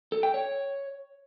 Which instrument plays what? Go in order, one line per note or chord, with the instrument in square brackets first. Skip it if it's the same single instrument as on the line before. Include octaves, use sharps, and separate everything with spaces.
[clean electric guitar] A4
G5
C#5